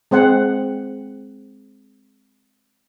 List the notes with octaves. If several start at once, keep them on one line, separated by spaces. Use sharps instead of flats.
G#3 C4 C5 F#5